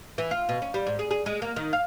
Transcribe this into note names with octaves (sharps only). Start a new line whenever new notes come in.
E3
F4
B2
C#4
G3
G#2
G#4
G#4
G#3
A#3
D#3
F5